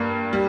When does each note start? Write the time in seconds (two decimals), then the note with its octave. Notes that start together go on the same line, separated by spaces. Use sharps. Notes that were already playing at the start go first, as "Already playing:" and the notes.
Already playing: G2 A#3
0.33 G3